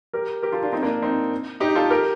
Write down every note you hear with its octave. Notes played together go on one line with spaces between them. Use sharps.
G4 A#4
G4 A#4
F4 A4
D4 F4
C4 D#4
A#3 D4
C4 D#4
D#4 G4
F4 A4
G4 A#4